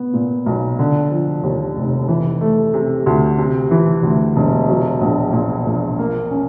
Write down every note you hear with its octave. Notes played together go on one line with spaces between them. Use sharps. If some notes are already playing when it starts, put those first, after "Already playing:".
Already playing: B3
A#2
B1
D3
F3
D#2
F1
E3
A3
C3
D2
C3
E3
D2
E1
F#3
A#1
A#2
A#1
A#3
C#4